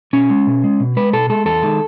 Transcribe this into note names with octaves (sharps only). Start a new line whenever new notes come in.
B2 C#4
G#3
B2
G#3
B2
G#3 B4
B2 A4
G#3 A4
E2 A4
D#3 G#3